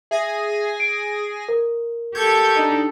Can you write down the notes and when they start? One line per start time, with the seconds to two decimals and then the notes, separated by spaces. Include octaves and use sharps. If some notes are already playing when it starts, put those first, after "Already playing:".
0.11 G#4 E5 G#5 A#6
0.80 D7
1.49 A#4
2.15 G4 A4 C#6 G6 G#6
2.56 D4 D#4